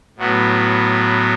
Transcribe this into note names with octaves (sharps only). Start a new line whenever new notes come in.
A2 F#3 B3